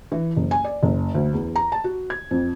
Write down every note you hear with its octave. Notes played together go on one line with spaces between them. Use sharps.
E3
F#1
G#5
D5
F#1
D2
E2
A#5
A5
F#4
G#6
F2